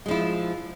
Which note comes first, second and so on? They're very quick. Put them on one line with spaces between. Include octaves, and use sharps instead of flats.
G#3 F3 E4